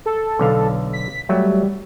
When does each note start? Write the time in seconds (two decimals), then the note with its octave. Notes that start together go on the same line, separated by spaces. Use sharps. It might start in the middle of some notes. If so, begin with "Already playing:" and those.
0.06 A4
0.39 B1 D3 F5
0.93 B6
1.29 F#3 G3 A3